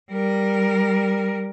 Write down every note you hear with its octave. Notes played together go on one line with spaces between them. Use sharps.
G3 A#4